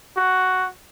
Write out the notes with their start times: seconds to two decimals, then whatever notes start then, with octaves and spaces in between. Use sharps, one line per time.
0.17 F#4